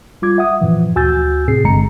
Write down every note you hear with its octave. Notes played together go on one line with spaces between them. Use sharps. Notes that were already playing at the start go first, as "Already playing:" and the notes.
G3 F4 D6 G#6
E5 F#5 D#6
F#2 A#2 E3 F3
D2 F#4 G#5 E6 G6 A6
A2 C3 C4 G#4 C7
G#1 G2 D3 G#3 A#5 C#7